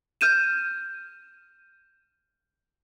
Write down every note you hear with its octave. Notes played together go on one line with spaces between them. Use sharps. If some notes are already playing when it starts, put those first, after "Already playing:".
F6 G6 D#7 E7